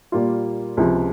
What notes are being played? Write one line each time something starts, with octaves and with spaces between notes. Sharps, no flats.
A#2 G3 A#3 F4
C#2 C3 F3 G#3